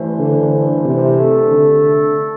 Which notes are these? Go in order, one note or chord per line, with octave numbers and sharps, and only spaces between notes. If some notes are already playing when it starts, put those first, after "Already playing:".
Already playing: G2 E3 A3 E4 C5
D3
C3
A3 D4 A4
D3